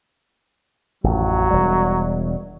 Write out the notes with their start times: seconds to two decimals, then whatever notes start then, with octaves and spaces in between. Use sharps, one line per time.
1.04 A1 F2 F#3
1.51 E1 G3